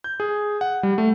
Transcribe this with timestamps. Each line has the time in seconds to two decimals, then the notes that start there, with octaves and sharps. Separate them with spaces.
0.04 G6
0.20 G#4
0.61 F#5
0.83 G3
0.98 A3